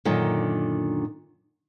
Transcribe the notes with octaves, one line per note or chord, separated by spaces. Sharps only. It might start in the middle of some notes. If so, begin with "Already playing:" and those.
F#2 A#2 D3 D#3